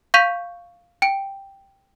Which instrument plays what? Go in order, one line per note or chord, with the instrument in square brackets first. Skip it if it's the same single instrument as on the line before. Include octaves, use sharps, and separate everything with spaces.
[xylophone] F5 C#6 G6 B6 D#7 F7
G5 D7